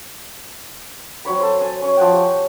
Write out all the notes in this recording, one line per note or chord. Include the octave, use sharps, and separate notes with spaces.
F#3 C4 C#5 B5
A4 C5
C#5 G#5
C#4 C#5
F3 F#5 G5
G4